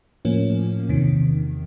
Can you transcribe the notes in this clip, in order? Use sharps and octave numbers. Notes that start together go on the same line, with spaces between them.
A2 F3 A#3 C#4
E2 C3 D#3